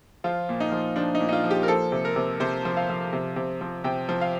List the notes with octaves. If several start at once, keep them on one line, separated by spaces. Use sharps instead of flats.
F3 F4
A#2
D#4
F3
F3 D4
D#4
A#2
D#4
F4
F3
G4
A#4
F3 A4
C3
A#4
C3
C3 C5
F3
F5
F3
C3
C3
F3
C3 G5
F3
F5